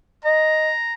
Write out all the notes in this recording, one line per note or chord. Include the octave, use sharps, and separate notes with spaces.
D#5 A#5